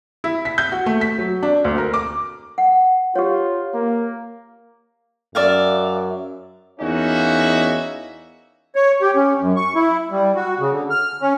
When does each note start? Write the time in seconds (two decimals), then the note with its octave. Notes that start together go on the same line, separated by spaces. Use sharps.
0.24 E4
0.45 B6
0.58 G6
0.72 F#4
0.86 A3
1.01 B6
1.18 F#3
1.43 D4
1.64 D2
1.78 A#4
1.94 D6
2.58 F#5
3.15 F4 G4 C#5
3.74 A#3
5.35 F#2 D5 E5 F5
6.79 E2 A#3 C#4 D#4 F#4 E5
8.76 C#5
9.02 G4
9.16 C#4
9.41 F#2
9.56 C#6
9.75 E4
10.11 G3
10.36 F#4
10.59 C#3
10.72 D3
10.90 F6
11.22 C#4